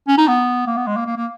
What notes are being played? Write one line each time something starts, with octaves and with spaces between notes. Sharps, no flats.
C#4
D#4
B3
A#3
B3
G#3
A#3
A#3
A#3